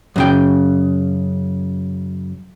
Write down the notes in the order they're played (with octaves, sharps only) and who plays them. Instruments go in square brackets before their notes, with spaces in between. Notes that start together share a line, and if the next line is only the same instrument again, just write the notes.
[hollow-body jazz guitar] F#2 C#3 G5